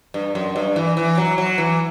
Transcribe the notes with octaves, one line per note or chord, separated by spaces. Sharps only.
G2
F#2
G2
E3
E3
F#3
F#3
E3